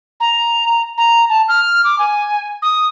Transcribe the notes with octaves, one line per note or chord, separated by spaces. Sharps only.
A#5
A#5
A5
F6
D6
G#5
D#6